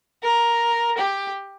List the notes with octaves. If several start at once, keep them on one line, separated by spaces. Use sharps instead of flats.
A#4
G4